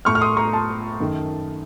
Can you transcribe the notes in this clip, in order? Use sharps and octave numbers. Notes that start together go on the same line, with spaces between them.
A2 A3 C#6 F6
F6
C6 D#6
A#5 C#6
A5 C6
F#2 D#3 A3